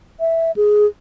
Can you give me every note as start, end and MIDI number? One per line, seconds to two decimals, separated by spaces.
0.20 0.51 76
0.57 0.86 68